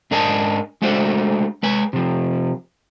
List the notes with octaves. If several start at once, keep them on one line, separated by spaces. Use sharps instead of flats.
G#2 D4 A#4 D#5 G#5 A5
G#3 A3 D4 F#4 C5
G#3 B4 G#5
C3 F3